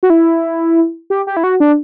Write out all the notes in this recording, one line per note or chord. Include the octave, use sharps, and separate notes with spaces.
F#4
E4
G4
G4
E4
F#4
D4